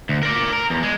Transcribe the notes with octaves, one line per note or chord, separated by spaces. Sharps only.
D2
A#4 D5
A#4
E2
G#3